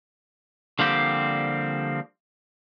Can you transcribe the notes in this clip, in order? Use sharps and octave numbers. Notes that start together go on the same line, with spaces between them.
D3 F3 G3 A#3 C4 G4